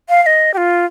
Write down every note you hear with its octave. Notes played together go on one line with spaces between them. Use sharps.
F5
F5
D#5
G4
F4